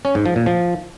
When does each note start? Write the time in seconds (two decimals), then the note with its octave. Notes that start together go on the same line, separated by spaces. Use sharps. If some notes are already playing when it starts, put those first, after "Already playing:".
0.05 C#4
0.15 G#2
0.26 F3
0.36 A#2
0.46 F3